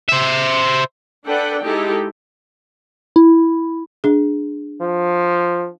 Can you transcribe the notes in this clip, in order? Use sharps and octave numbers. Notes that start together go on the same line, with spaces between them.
C5 E5
D4 A4 B4 D5 F#5 G5
G#3 D#4 E4 G4 A4
E4
D4 G#4
F3